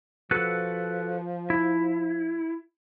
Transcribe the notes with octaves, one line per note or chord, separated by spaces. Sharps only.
F3 F#4 A4 B4
E4